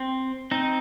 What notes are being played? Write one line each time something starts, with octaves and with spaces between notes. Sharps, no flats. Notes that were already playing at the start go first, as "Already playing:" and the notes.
Already playing: C4
C4 D#4